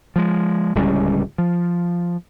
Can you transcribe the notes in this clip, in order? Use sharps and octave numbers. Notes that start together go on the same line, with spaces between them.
F3 G#3
D1 C#2 G3 C#4
F3